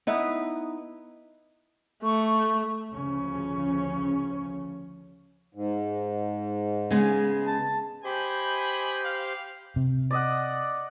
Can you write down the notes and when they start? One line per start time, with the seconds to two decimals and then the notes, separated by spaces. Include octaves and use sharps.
0.07 B3 D#4 E4 B4
2.04 A3 C#6
2.92 D2 C#3 F3 C#4
5.55 G#2
6.91 C#3 G#3 B3
7.47 A5
8.05 G4 C5 D#5 G#5 B5
9.04 F5
9.76 C3
10.11 D5 D#5 F#5